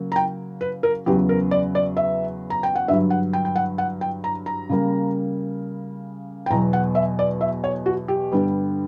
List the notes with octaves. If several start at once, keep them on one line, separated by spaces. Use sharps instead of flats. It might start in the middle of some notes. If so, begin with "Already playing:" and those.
Already playing: C#3 F#3 A#3
A#5
G5
B4
A#4
E2 C#3 F#3 B3 G4
A#4
D5
D5
E5
A#5
G5
F#5
G2 D3 F#3 E5
F#5
G5
G5
F#5
F#5
G5
A#5
A#5
C#3 G3 A#3
G5
E2 B2 F#3 A#5
F#5
E5
D5
E5
C#5
F#4
G4
G2 D3 G3 B3